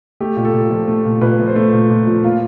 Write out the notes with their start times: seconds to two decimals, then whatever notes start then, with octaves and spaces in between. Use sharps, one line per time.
0.20 A3 G4
0.37 A#2
0.45 A4
0.53 A#2
0.70 F3
0.88 A3
1.05 A#2
1.21 A#2 B4
1.40 F3
1.48 C5
1.56 A3
1.73 A#2
1.90 A#2
2.07 F3
2.23 A#3 F4